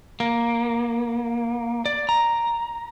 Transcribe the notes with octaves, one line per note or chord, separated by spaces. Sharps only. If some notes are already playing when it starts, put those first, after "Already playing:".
A#3
D5
A#5